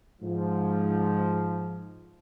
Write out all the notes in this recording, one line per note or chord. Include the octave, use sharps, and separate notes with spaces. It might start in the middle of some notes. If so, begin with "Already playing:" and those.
G#2 F3